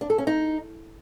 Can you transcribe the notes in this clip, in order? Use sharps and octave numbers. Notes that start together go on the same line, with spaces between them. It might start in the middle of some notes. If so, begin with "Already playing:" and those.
D4
A4
C#4
D#4